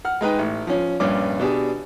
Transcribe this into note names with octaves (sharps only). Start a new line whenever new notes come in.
F#5 F6
G#3 D#4 B4 G5
A1
F3 C#4
A#1 G2 C#4 D5 D6
B2 D4 G4 G#4